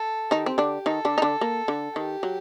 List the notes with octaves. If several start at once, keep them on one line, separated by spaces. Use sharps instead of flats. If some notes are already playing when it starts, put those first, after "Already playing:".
Already playing: A4
D#3 D#4 G4
C4
D3 D4
D#3 D#4 A4
D3 D4
D#4
D3 D4
A#3
D3
D#3 G4
F#3